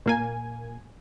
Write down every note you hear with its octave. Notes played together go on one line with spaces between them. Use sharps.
A#2 A#3 G#5